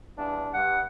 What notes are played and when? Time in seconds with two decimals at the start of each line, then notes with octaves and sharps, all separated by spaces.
0.17 E2 G2 D4
0.53 G2 F#5